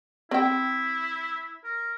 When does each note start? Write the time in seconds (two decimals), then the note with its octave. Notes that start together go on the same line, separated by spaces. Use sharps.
0.31 C4 E4 G5
1.64 A#4